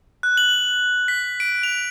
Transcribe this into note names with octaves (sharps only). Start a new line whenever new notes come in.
F#6
F#7
B6
D7
F7